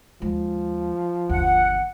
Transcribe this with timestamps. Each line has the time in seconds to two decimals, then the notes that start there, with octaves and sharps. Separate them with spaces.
0.22 D#2 F3 G#3
1.29 G1 D#2 F#5